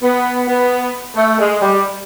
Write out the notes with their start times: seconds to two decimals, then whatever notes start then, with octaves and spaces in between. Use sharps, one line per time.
0.02 B3
0.47 B3
1.16 A3
1.39 G#3
1.61 G3